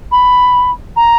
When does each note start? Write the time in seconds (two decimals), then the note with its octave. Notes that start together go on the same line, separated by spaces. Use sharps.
0.11 B5
0.96 A#5